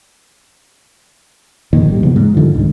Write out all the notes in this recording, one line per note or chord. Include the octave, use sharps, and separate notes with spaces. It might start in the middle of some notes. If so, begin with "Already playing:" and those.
G1 F2 A#2 D#3
A1 G3
E1 C#3 F3 B3
G#2
G2 D3 D#3 F3
C#2 G#2 D#3